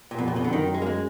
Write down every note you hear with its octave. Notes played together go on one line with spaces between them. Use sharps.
A#2
F2 B2
A#2
B2
D3
F#2 D#3
G#3
A#3
G#3